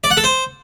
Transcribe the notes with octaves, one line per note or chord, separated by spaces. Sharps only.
D5
F#5
A4
C5